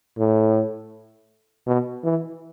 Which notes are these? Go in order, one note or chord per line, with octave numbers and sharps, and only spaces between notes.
A2
B2
E3